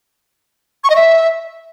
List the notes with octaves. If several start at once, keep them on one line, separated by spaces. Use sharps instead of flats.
C#6
D#5
E5